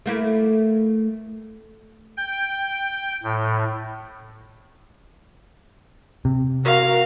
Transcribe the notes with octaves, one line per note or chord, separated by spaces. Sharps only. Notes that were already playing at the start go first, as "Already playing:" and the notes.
A3 A#3 E4
G5
A2
C3
F#4 A#4 F5